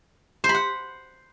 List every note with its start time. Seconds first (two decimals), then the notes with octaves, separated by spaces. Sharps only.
0.44 C5
0.49 B5
0.54 F#5